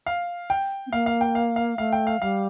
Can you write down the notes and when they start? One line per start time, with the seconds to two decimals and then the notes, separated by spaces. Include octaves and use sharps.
0.06 F5
0.50 G5
0.87 C4
0.92 A#3 F5
1.06 F5
1.21 G5
1.35 F5
1.56 F5
1.78 A3 F5
1.93 G5
2.07 F5
2.21 G3 F5